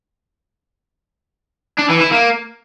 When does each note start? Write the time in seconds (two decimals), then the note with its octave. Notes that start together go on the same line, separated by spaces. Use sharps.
1.78 D4
1.89 E3
2.00 E4
2.11 A#3